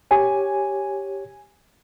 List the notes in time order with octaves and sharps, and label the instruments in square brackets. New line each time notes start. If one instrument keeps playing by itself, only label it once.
[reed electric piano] G4 C#5 [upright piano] G#5